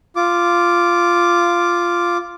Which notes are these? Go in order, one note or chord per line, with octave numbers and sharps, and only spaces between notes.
F4 D6